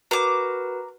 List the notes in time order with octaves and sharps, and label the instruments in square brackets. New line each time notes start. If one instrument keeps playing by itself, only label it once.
[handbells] F#4 A#4 B4 [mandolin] A#5 D6